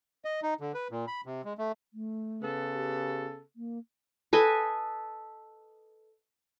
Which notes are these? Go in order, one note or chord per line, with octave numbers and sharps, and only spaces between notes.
D#5
D#4
D3
B4
A#2
B5
C3
G#3
A3
A3
C#3 B3 A4
G4
A#3
A4 B4 D#5 G#5